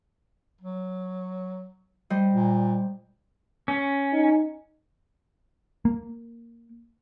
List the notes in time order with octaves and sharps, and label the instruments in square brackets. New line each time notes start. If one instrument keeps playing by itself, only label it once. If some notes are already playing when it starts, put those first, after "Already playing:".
[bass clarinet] F#3
[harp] G3 C5 D#5
[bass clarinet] A#2
[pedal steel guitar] C#4
[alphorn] D#4
[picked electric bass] A#3